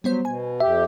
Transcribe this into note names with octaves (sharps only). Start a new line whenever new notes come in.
F#3 G3 B3 C5
B2 G#5
F2 G4 E5